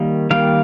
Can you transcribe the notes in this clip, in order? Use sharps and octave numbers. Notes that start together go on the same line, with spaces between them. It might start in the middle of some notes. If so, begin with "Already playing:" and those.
Already playing: D#3 G3 A#3
D#3 G3 A#3 F5